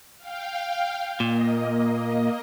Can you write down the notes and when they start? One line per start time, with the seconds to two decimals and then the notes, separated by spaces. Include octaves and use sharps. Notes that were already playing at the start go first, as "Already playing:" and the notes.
0.18 F5 G5
1.20 A#2 A#3 D#5